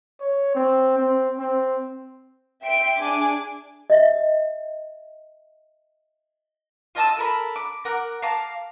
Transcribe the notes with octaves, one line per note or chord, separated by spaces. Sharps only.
C#5
C4
C4
C4
E5 G5 C6 D7
D4 G#4 G#5 D6
D#5 E5
F4 D#5 A5 E6
A4 A#4 B5
D6
A#4 F#5 D6
F5 A5 A#5 D6